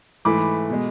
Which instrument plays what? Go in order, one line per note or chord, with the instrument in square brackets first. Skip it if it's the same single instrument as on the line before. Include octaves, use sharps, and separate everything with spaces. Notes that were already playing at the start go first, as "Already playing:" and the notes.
[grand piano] G#2 E3 A3 B5 D6
B2 G#3